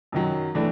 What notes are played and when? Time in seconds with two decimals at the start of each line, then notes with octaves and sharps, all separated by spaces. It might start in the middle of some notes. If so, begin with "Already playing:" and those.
0.12 F#2 D#3 F#3
0.54 A2 E3 A3 D4